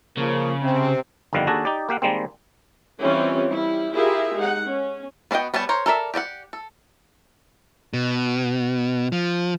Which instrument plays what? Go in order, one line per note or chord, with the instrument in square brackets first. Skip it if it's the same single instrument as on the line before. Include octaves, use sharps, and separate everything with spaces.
[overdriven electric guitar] C#3 [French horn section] F3 A#3
[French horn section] C3 C4
[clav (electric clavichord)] G1 F2 D#3 G3 F5 F#5
D#2 D4 F#4 G#4 A4 A#5
D#4 G4 D5
A#3 G4 F5 F#5
D#3 G3 G#3 A#3 C4
[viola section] E3 G3 C4 C#4 F4
G3 E4
E4 F4 G4 G#4 A#4 E5
G#3 D#4 F#5
C#4
[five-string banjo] B3 D4 F#4 D#5 G5
G3 B3 C#5 A5
A#4 C5 C#5
A4 A#4 D5 E5
G4 D5 D#5 F#5
A4
[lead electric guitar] B2
F3